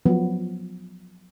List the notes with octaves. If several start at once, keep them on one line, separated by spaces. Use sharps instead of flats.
F3 F#3 B3